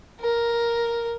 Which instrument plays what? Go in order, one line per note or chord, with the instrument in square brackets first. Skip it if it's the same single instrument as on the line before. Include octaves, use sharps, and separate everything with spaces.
[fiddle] A#4